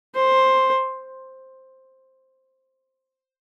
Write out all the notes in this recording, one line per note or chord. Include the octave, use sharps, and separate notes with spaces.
C5